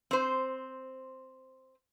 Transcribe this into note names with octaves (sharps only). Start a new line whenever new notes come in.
C4 C5